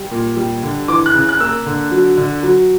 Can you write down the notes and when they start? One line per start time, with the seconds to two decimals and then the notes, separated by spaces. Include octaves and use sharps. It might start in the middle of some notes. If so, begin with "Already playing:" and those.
Already playing: G3
0.11 A#2
0.37 G3
0.63 D3
0.88 E3 D6
1.06 F#6
1.14 C#3
1.29 F#6
1.40 A#3 E6
1.66 D3
1.91 F#3
2.17 D3
2.43 F#3